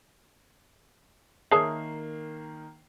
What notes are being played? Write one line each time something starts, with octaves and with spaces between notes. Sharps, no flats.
D#3 A#3 G#4 C#5 E5 A5 D#6 C7